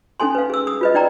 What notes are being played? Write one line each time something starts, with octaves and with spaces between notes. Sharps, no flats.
C#4 D#4 A4 G#5 C6
B4 F5
G#4 E6
D#6
F4 B4 D#5
D#4 D5 G5 A#5